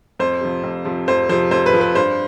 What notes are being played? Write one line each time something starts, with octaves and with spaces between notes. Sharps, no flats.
F2 C5
C3 F3
F2
C3 F3
F2 C5
C3 F3 C5
F2 C5
B4
C3 F3
B4
G2 C5